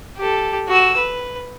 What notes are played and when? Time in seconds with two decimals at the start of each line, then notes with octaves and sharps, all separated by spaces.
0.17 G4 A4
0.68 F#4 E6
0.97 B4